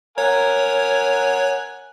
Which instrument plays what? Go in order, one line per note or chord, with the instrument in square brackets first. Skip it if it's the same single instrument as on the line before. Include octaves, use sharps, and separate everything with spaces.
[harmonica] A#4 F#5 G#5 [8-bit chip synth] C#5